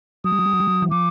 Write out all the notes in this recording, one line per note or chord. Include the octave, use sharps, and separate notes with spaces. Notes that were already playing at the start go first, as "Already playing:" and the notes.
F#3 D#6
G3
F#3
G3
F#3
G3
F#3
E3
F3 D6